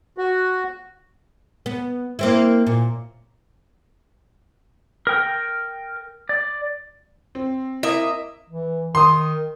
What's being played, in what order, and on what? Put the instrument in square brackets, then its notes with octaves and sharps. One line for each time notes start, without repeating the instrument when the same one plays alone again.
[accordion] F#4
[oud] B3
A#3 C4 E4
A#2
[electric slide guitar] A#4 G5
D5
[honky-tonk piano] C4
[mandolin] A#3 D#5 A#5 [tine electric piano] E4 [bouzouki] E5
[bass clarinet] E3
[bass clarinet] D#3 [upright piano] C6 D#6